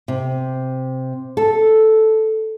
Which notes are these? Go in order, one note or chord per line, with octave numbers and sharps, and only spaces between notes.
C3
A4